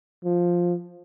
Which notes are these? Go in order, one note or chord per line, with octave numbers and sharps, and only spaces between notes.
F3